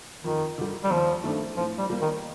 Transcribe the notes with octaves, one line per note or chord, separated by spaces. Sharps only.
F2 D#3
D3 G3
G3
D#2 F3
D#3 A3 D4 A4
A2 F3
G3
G3 A#3
D#3